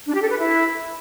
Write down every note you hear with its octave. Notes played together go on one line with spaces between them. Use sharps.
D4
G4
A4
B4
E4